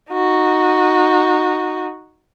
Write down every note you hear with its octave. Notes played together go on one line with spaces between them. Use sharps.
D#4 F#4